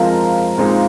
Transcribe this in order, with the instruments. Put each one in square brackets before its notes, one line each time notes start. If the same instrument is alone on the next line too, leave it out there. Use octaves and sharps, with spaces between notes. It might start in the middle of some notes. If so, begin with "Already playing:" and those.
Already playing: [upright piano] F3 G#3 C4 [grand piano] A#4 F5 A#5
[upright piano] A#2 G#3 C4 D#4